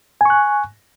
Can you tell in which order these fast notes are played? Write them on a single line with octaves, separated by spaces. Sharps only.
G#5 C#6 F#6